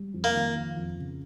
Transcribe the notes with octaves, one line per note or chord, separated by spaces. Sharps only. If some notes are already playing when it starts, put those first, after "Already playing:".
Already playing: G3
F2
A#3
D#3
F3
F2
C#3